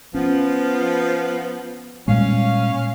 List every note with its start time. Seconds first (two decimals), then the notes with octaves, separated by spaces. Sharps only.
0.14 F3 B3 C#4
2.08 A#2 G3 G#3 C#4 F5